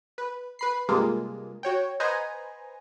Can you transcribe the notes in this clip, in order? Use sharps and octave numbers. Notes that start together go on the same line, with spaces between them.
B4
B4 B5 C7
G2 C3 G#3 A#3 F4
F#4 C#5 G5
B4 C5 D#5 F#5 G#5 A#5